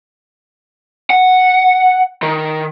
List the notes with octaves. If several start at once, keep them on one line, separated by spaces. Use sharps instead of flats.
F#5
D#3